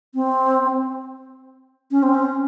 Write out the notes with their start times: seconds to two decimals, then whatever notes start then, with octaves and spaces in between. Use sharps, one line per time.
0.15 C4
1.91 C#4
2.03 C4
2.14 C#4